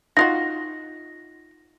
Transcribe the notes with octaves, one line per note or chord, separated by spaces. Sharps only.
D#4 F4 F#4 A#6